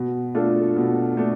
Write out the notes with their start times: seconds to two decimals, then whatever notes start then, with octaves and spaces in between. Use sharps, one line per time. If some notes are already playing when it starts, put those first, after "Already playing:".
Already playing: B2
0.35 A3 D4 F4 A4
0.76 B2
1.17 A3 D4